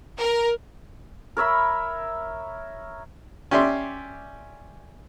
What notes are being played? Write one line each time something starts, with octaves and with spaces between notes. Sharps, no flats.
A#4
A#4 C#5 E5 B5
C#4 G4 D5 E5 C6